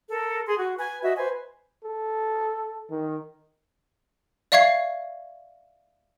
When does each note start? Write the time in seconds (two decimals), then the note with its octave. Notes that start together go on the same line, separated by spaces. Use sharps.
0.10 A4 A#4
0.47 G#4 C6
0.59 F#4
0.78 B4 G#5
1.02 F#4 D#5 E5
1.17 B4 C5 G#5
1.84 A4
2.90 D#3
4.52 D5 E5 F5 C#6 G#6 C7